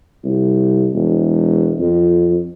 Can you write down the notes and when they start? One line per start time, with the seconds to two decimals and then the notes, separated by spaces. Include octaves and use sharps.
0.24 C2
0.93 E1
1.79 F2